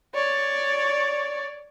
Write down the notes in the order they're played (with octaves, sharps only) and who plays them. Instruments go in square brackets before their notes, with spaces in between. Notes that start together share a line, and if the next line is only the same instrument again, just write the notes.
[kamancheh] C#5 D5